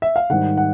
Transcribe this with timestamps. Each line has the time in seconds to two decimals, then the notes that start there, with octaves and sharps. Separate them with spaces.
0.02 E5
0.16 F5
0.30 G#2 D#3 G3 F#5
0.57 F#5